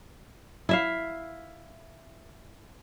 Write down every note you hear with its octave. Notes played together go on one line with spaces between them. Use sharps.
E4 E5 F5